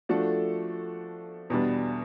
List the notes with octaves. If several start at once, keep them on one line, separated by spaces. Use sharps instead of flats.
F3 A3 D4 F#4 A4
E2 B2 G3 B3 D4